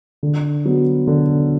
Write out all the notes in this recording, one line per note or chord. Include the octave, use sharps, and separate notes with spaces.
D3
F#3 B3
D3